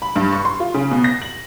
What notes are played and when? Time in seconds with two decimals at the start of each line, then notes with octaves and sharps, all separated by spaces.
0.02 B5
0.16 G2
0.33 C#6
0.45 C6
0.60 F4
0.74 C#3
0.91 B2
1.04 A#6
1.22 F#7